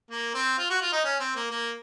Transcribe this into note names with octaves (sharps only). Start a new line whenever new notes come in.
A#3
C4
F4
F#4
F4
D#4
C#4
C4
A#3
A#3